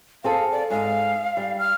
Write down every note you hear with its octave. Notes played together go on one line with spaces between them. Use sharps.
C4 G#4 A4 F5
D5
G#2 D#4 F5
G3
F6